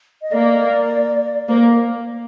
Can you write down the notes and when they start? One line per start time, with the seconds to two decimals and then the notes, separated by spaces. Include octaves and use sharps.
0.22 D#5
0.32 A#3 D5
1.49 A#3 C5
1.58 A#4